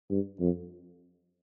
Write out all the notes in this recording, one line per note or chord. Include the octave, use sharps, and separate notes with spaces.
G2
F2